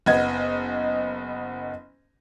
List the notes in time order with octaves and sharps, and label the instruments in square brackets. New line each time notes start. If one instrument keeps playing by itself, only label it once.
[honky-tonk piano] F#1 B3 D#5 G#6